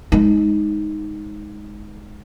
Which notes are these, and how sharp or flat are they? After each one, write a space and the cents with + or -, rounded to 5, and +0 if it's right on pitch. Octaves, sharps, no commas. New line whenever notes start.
G#3 +5 D#4 +0